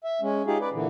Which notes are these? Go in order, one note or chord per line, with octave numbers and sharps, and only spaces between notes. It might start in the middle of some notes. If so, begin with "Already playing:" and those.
E5
G#3 C#4
D#4 F4 G4 G#4
B4 D5
A#2 D3 E3